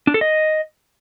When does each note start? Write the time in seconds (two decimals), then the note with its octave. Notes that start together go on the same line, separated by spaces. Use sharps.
0.07 D4
0.14 A4
0.21 D#5